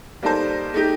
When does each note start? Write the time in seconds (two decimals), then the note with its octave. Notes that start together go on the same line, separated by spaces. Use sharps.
0.23 G3 A#3 D#4 A4 C5
0.74 A3 D#4 G4